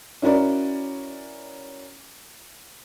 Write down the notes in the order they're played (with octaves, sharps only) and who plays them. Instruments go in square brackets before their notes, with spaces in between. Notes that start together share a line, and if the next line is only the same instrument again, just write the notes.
[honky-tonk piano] C#4 E4 F#4 A#4 D5